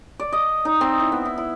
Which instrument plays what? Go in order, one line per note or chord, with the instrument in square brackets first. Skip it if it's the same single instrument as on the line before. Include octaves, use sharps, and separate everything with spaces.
[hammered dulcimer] D5
D#5
D#4
C4
E4
B3
E4
E4